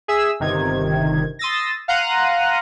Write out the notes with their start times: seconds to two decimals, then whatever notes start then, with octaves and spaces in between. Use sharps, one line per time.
0.08 G#4 E5 E6
0.40 G1 C3 D#3 G#6
1.39 C6 D#6 E6 A6 A#6
1.88 F5 F#5 A#5 C6 F#6 D#7